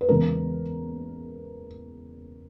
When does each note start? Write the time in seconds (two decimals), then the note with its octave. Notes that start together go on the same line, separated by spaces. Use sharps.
0.01 B4
0.09 E2 C#3 E3 G#3 A#4